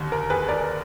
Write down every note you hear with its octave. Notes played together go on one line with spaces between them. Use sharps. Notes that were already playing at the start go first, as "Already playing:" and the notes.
Already playing: D#2 D3
A#4
G#4 B4
A#4 D5